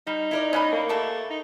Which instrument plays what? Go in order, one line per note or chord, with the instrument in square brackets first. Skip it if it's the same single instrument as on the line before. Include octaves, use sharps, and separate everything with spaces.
[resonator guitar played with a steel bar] G3 [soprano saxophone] D#4
[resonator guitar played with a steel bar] E4 A#4 D5
[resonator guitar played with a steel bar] A2 D#5 [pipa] C#4 F#5 B5
[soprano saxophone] A#3
[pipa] A3 G4 A4
[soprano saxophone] D#4